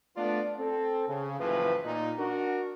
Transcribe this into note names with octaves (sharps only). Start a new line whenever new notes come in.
A3 B3 D4 F4 D5
C4 A4
C#3
F#1 A2 E3 F3 B4
A#2 D#4
D4 F#4 A#4